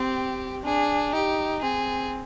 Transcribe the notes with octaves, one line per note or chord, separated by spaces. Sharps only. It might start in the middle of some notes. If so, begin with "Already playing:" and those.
Already playing: C4 G4
D4 G#4
D#4 G4
C4 G#4